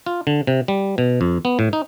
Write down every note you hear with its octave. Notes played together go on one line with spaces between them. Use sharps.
F4
D3
C3
G3
B2
F2
B3
A2
D#4